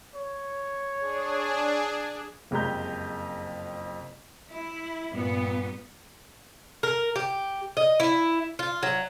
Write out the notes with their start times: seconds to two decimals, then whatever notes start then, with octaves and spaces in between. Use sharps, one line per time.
0.15 C#5
1.00 D4 G#4
2.51 F#1 F2 G#3 G4 A#5 G6
4.49 E4
5.11 G2 A#2 B3
6.83 A#4
7.16 G4
7.77 D#5
8.00 E4
8.59 F4
8.83 F#3